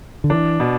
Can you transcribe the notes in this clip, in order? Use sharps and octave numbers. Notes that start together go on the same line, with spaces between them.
D3
E3 D4
B2